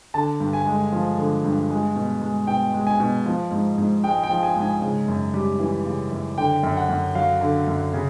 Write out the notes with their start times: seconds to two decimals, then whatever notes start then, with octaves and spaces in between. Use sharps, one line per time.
0.14 D3 A5
0.40 G2
0.53 G#5
0.66 G#3
0.92 F3
1.18 D3
1.44 G2
1.70 G#3
1.96 B2
2.22 G#3
2.47 B2 G5
2.74 G#3
2.87 G#5
3.00 B2
3.26 F3
3.51 G#2
3.78 G#2
4.04 G#3 G5
4.23 G5
4.30 F3
4.43 G#5
4.56 G#2
4.62 G#5
4.82 C#3
5.08 F#2
5.34 G3
5.60 E3
5.85 C#3
6.12 F#2
6.37 D3 G5
6.63 F#2
6.77 F#5
6.89 F#2
7.15 F#3 F5
7.41 D3
7.67 F#2
7.93 C#3